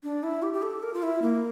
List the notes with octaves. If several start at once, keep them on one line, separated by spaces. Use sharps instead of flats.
D4
E4
G4
G4
A4
A#4
F4
E4
A#3